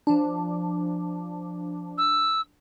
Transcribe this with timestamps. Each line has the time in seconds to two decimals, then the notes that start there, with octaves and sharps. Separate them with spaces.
0.07 F3 D4
1.98 E6